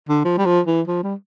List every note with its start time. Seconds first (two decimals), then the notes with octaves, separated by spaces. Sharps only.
0.09 D3
0.25 F3
0.38 G3
0.46 F3
0.67 E3
0.88 F3
1.04 G3